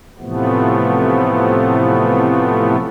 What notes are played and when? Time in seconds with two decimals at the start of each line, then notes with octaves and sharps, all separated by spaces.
0.19 A2 C3 E3 F3 A3 B3